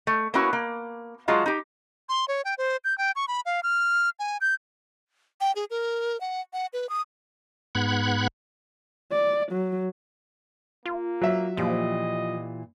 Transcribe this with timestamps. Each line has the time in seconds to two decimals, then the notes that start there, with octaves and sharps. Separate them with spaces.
0.07 A3
0.34 A#3 B3 C#4 E4 F#4
0.53 A#3
1.28 F#3 G#3 F4 A5 A#5
1.46 D#4 G4
2.09 C6
2.28 C#5
2.45 G5
2.58 C5
2.84 G6
2.98 G5
3.16 C#6
3.28 B5
3.46 F5
3.63 F6
4.19 G#5
4.41 G6
5.41 G5
5.56 G#4
5.70 A#4
6.21 F#5
6.53 F#5
6.73 B4
6.89 D#6
7.75 G#2 B3 F#5 B5 F#6 G#6
9.12 D5
9.52 F#3
10.85 A#3 F4
11.21 F#3 E5
11.57 A#2 E3 F3 G4 D#5